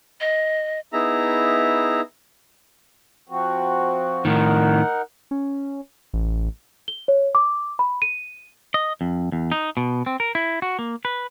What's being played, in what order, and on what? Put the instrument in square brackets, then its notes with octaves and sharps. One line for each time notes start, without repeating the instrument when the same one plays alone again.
[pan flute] D#5
[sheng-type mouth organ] B3 D#4 E4 G#4 E5 A#5
[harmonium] F3 C4 F#4
[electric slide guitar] A2 D#3 [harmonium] D#4 A#4 F#5
[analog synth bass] C#4
A1
[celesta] G7
C#5
D6
B5
D#7
[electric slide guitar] D#5
F2
E2
D#4
B2
C4
A#4
E4
F#4
A#3
B4